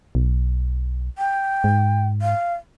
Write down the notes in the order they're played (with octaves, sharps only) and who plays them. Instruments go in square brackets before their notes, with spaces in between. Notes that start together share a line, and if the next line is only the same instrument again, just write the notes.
[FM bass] B1
[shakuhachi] G5
[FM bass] G#2
[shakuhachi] F5